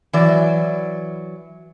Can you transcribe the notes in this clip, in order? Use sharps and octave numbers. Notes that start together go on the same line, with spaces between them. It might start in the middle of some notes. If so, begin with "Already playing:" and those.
E3 F#3 D5